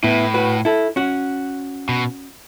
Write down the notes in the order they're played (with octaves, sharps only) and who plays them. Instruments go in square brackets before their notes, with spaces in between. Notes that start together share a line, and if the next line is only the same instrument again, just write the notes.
[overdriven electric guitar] A2 [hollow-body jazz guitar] B3 E4
[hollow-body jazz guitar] F#4 B4
E4 A4
C#4 F#4
[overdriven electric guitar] B2